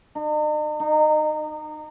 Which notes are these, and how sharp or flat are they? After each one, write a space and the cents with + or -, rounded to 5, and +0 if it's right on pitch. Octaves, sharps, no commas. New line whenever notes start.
D#4 -45
D#4 -25